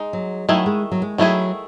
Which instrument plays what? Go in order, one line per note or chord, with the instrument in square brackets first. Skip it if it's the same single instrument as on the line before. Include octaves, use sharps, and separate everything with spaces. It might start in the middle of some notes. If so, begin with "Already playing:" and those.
Already playing: [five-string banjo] G#3 D#4
[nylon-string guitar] F#3
[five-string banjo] D#3 A3 E4 G#4 [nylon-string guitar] F#3
[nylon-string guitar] G#3
F#3
G#3
[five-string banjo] D#3 A3 E4 G#4 [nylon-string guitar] F#3